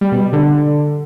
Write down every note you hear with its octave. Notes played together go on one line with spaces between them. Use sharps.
G3
B2
G3
D3